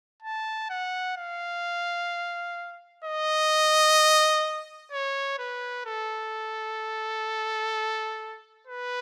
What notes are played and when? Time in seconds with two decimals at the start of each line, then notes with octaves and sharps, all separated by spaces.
0.23 A5
0.70 F#5
1.17 F5
3.04 D#5
4.92 C#5
5.39 B4
5.86 A4
8.67 B4